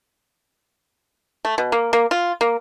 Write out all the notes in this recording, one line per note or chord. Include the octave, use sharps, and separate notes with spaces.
A3
B2
A#3
A#3
F4
A#3